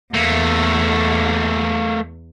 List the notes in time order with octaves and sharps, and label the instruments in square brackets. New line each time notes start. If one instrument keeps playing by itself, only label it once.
[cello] E2 [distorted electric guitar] A3 A#3